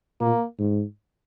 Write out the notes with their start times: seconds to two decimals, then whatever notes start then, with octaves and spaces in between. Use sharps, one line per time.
0.20 A#2 A#3
0.59 G#2